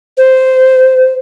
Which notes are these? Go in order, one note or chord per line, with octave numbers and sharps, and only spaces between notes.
C5